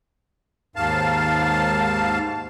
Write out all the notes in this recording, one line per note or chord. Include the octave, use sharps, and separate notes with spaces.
D#2 G#2 F5 A5